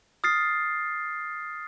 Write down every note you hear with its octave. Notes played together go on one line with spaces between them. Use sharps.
D#6 F6 A6 C7